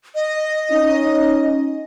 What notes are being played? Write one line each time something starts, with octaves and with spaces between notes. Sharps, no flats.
D#5
C#4 D#4